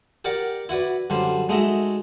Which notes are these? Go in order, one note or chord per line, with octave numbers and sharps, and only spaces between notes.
G4 A#4 D5 F#5 D6
E4 F#4 B4 D5
F#2 D3 G3 C5
G#3 A3 D#4 F#4 E5